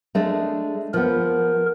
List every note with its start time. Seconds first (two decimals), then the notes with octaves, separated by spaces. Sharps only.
0.15 G#3 A3 D4
0.94 F3 B3 A#4